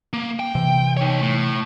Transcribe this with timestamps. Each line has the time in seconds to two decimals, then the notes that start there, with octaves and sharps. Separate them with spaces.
0.13 A#3
0.40 G5
0.55 C3 E3
0.97 D#4 C#5
1.22 A2